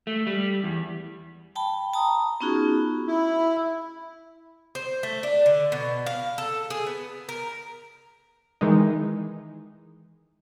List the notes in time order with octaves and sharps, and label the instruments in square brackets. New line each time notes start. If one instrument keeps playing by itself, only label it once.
[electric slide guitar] A3
G3
E2
[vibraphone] G5 A5 B5
A5 A#5 D#6
B3 C#4 D#4 F4 F#4 G#4
[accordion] E4
[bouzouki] C5
A3
D4
D3
B2
F5
A4
G#4
B3
A#4
[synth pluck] D#3 E3 G#3 D#4